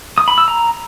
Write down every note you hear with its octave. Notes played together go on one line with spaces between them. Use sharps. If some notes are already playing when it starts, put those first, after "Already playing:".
D#6
B5
E6
A#5